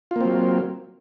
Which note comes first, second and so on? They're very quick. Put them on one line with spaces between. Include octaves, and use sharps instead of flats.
F4 A#3 C4 F#3